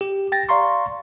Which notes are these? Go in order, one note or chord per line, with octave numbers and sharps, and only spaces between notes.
G4
G5 A6 A#6
D5 F5 A#5 C6 C#6